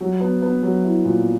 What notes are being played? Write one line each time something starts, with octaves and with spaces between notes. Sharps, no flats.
F#3
B3
B3
F#3
E4
A#2